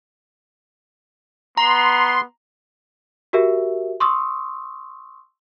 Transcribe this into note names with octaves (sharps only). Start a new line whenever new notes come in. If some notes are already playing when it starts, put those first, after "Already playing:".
B3 A#5 C6
F#4 G4 A#4 E5
C6 C#6 D#6 E6